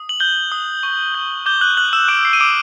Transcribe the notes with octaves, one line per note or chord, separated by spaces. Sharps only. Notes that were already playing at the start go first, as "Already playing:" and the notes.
Already playing: D#6
F#7
F#6 G6 G7
D#6
C#6
G6
D6 G6 G7
F#6 F#7
F6 F#6 F#7
E6 E7
D6 F#6 D7
C7
D#7
D6 D#6 D7